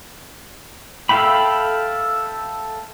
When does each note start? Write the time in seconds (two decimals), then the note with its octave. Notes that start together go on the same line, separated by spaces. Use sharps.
1.09 A4 E5 F5 G5 B5